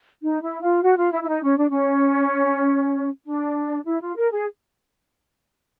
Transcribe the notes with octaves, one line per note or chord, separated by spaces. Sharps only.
D#4
E4
F4
F#4
F4
E4
E4
D#4
C#4
D4
C#4
D4
E4
F4
A#4
G#4